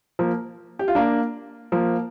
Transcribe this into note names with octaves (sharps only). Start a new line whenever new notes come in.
F3 A#3
G4
F4
A#3 D4
F3 A#3